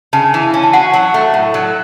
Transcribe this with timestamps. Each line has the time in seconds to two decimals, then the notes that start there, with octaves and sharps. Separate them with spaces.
0.13 C#3 A5
0.34 E3
0.43 A5
0.54 C#4
0.63 A5
0.73 F#4 F#5
0.94 F#3
1.14 A3
1.34 A2
1.54 F#3